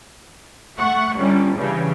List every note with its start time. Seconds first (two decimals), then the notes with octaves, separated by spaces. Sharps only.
0.78 A3 F#5 C#6
1.17 G1 G3 C#4
1.57 G2 C#3 E3